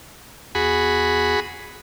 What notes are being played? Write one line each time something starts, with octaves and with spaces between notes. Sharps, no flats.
E2 F#4 G#4 B5